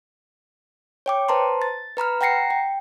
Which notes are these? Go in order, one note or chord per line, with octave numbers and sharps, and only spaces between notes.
C#5 G5 D6
B4 C5 A5 A#5 C6
A6
B4 A#5 B5 F6
F#5 G5 A#5 A#6 C7 C#7
G5